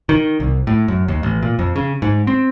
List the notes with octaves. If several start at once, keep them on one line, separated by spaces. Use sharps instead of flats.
D#3
C2
A2
F#2
D#2
A1
A#2
F2
C#3
G#2
C4